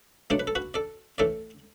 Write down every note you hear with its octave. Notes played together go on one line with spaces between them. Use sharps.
B2 F#3 A3 D4 D5
B4
A4
F#4 B4
A4 D5
A2 E3 A3 A4 D5